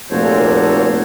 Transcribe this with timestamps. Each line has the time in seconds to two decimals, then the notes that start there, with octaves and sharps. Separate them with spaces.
0.10 F1 A#2 F#4 A4 C5 C#5